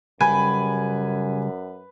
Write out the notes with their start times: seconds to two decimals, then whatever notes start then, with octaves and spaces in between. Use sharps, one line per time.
0.21 F#2 C#3 G3 B4 G5 G#5